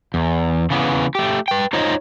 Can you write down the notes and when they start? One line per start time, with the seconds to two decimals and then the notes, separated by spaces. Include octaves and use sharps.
0.14 E2
0.70 C#3 E3 B3
1.15 A3 G4
1.48 B4 G5
1.73 D#4 F4 C5 C#5 D#5